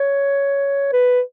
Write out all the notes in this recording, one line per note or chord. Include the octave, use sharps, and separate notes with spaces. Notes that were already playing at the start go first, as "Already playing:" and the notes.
Already playing: C#5
B4